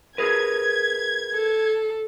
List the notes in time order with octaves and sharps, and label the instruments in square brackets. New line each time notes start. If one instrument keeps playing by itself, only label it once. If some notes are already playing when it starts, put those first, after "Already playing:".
[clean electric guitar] G#4 A#4 B4 [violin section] G#6
[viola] A4